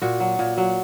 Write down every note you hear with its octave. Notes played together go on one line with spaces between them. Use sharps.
A#2 F#4
F#3
A#2
F#3